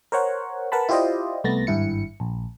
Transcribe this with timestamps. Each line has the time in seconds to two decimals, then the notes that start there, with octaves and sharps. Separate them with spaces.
0.12 A#4 C5 C#5 F#5
0.72 A#4 B4 F#5 A5 B5
0.89 E4 F4 G4 C5 D5 D#5
1.44 C2 A3 B3 A6 A#6
1.67 G#1 G2 E4 C#7
2.20 A#1